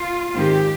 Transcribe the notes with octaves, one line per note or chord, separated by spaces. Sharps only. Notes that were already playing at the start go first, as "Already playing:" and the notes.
Already playing: F4
G#2 D#3 G#3 C4 G4